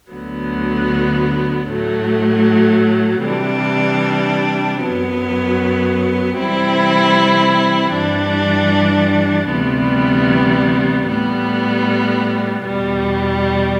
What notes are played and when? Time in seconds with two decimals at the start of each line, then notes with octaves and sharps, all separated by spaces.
0.12 D2 D3 F#3 B3
1.69 A2 F#3 A3
3.25 C3 E3 G3 D4
4.82 F#2 F#3 B3
6.38 C3 E3 G3 C4 E4
7.95 G2 E3 G3 D4
9.52 D2 C3 E3 G3 B3
11.08 A2 G3 B3
12.64 E2 B2 G3